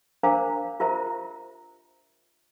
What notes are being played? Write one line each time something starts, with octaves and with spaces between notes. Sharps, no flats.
D4 A#4 C5 F5 A#5 D6
F4 G4 A#4 C5 E5 A#5